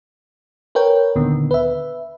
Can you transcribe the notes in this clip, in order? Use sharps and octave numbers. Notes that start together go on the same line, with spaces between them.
A#4 B4 C#5 G5
D2 A#2 D3 D#3 B3
B4 E5